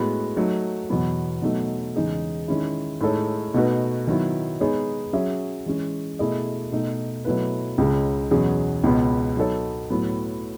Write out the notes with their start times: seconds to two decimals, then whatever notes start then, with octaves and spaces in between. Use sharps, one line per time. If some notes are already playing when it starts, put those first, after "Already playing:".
Already playing: A2 G#3 B3 F#4
0.37 F#3 A3 D#4
0.90 E2 B2 F#3 B3
1.42 B2 F#3 A3 D#4
1.96 E2 C#3 G#3 D#4 G#4
2.48 D#3 G#3 C#4 E4
3.01 A2 G#3 D#4 A4 C#5
3.54 B2 A3 D#4 F#4 B4
4.07 D#3 F#3 B3 E4
4.60 G#3 B3 D#4 G#4 C#5
5.13 F#3 C#4 G#4 C#5 E5
5.66 E3 G#3 C#4
6.19 B2 A3 E4 G#4 D#5
6.72 B2 A3 D#4
7.25 B2 F#3 A3 E4 B4
7.78 C#2 C#3 G#3
8.31 E2 B2 F#3 C#4 G#4
8.84 C#2 B2 G#3 B3
9.37 F#3 B3 D#4 A4 C#5
9.90 A2 F#3 B3